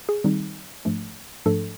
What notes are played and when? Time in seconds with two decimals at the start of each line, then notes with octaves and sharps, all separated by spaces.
0.09 G#4
0.24 D#3 G3 C4 D#4
0.85 G#2 F3 A3 D4
1.46 G#2 F3 A3 D4 A4